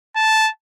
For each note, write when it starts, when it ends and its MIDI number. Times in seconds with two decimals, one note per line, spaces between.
0.16 0.50 81